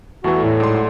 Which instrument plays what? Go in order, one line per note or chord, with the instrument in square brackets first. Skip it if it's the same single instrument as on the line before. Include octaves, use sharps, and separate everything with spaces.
[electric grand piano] E2 E3 [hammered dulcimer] G3 A3 [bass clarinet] F#4
[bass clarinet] A2
[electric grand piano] G#2 C6 [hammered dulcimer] F#3 D5
[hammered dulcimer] F#4